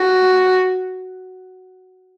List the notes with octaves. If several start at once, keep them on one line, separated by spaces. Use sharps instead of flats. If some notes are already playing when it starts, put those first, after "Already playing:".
Already playing: F#4